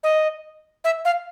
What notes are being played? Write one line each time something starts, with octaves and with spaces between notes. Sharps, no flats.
D#5
E5
F5